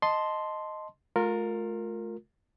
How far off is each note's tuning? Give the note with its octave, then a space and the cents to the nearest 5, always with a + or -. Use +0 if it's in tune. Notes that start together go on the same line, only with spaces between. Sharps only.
D#5 +0 A5 +0 C6 +0
A3 -45 F4 +25 A#4 -10